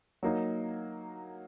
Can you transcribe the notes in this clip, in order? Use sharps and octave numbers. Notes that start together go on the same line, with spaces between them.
F#3 A#3 D#4